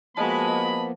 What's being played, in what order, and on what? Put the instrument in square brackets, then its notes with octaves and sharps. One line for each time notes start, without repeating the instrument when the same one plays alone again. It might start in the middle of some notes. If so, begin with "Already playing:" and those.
[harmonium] F3 A#3 B3 [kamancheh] G#3 F#4 [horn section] D#5 B5 [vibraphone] A5